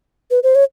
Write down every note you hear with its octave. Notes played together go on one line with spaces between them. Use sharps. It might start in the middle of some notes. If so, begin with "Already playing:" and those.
B4
C5
C#5